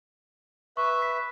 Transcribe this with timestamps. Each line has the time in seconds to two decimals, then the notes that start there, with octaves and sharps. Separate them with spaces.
0.77 B4 E5 C#6
0.99 C#6 B6